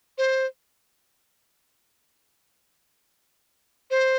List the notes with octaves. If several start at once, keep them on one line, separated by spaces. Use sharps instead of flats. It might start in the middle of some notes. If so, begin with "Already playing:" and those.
C5
C5